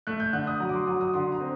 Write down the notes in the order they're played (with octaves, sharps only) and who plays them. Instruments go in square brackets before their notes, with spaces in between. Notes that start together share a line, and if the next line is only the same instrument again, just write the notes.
[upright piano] A3 F#6
G6
D3 F#6
D#6
F#3 A#5
D6
C6
F#3 D6
D#6
D3 C6
A#5
C4